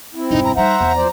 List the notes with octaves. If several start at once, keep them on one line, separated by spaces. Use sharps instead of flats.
C4 E4
E1 G2 D#4
A#5
G3 D#4 C5 E5 F#5 A#5
E2
F3 C5 D5